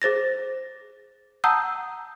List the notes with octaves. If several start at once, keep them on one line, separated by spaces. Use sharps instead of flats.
G#4 C5 A6 A#6
F#5 A5 A#5 D#6 E6 G6